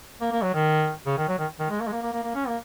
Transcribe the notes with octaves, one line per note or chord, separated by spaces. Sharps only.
A#3
A#3
F#3
D#3
C#3
D#3
F#3
D#3
D#3
G#3
A#3
G#3
A#3
A#3
A#3
A#3
C#4
A#3